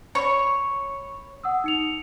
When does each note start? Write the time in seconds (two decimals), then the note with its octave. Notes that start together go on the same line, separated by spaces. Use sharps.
0.15 C#5 B5 C#6
1.44 F#5 D#6 E6
1.64 D#4 C#7 F7